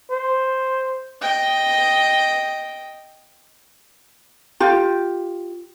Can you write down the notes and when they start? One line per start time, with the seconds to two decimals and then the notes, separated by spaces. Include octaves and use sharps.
0.11 C5
1.21 D#5 G5
4.60 F4 G4